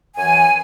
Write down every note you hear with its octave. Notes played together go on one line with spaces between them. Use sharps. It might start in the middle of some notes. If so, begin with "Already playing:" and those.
F#2 E3 G#5